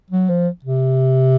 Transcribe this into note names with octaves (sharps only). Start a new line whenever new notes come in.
F#3
F3
C3